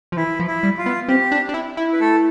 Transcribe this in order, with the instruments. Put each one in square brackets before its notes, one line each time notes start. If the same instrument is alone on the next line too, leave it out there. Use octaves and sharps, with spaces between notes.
[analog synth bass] F3
[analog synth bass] E3 [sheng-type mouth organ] E4
[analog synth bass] F3
[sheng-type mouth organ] E4
[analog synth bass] G3
[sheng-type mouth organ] F4
[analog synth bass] B3
[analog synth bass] C4 [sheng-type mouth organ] G4
[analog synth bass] D4
D4
E4
E4
[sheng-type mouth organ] B4
A3 A4